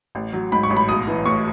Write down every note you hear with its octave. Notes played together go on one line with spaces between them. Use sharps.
A1
F#3
G#2 B5
C#6
A1
B5
B1 D#6
E3
A2 C#6